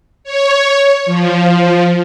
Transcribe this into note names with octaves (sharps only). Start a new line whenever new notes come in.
C#5
F3